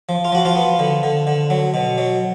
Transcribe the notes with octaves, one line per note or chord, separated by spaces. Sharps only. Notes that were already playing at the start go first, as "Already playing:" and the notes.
F3
F4
F3 F#4
F3 F4
B3
D3
D3
D3
F#3
B2
F#3